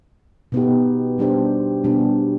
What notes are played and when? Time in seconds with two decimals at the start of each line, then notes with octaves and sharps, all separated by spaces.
0.52 B2 B3 D#4 G4
1.18 B2 G3 D4 G4 C5
1.84 B2 G3 B3 D4 G4